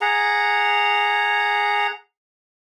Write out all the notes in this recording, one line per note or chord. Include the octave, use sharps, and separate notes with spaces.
G#4 F#5 A#5